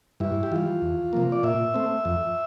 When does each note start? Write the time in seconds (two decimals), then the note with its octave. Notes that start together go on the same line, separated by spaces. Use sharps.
0.20 G2 E4
0.43 G4
0.52 E3 G3 F4
0.82 E2
1.13 C3 F3 A#3
1.32 D5
1.43 A#2 E5
1.74 A3 C4
2.05 F2